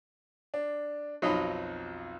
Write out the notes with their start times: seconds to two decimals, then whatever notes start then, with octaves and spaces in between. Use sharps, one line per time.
0.54 D4
1.22 B1 F2 F#3 D#4 B5